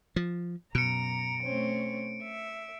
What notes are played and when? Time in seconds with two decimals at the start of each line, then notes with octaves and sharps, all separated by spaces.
0.16 F3
0.75 F#2 B2 A#5 C#7 D7
1.44 A3 C4 C#4
2.24 E5